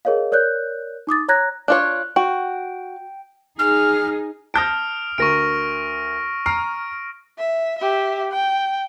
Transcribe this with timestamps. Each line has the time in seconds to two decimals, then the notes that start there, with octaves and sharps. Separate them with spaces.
0.05 G#4 A#4 C#5 D#5 F5
0.32 A#4 C#5 D5 F#6 G6
1.07 D#4 D6 D#6 A6
1.28 C#5 A#5 F#6 G#6 A#6
1.68 D4 F4 C#5 F#6
2.16 F#4 G5
3.59 D#4 G#4 F6
4.54 A5 D#6 F6 G6 A#6 D7
5.18 D2 A#4 C#6 A#6 D7
6.46 A#5 F6 C7 D7
7.38 E5
7.78 G4 E5
8.31 G5